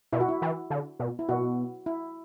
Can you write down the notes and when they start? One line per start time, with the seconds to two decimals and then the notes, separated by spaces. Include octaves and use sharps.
0.12 B2 E4
0.20 F#4
0.29 E4
0.42 E3
0.70 D3
0.99 B2
1.19 E4
1.29 B2 F#4
1.86 E4